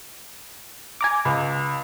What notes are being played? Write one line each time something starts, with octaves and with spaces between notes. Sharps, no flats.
G#5 A#5 D6
C#2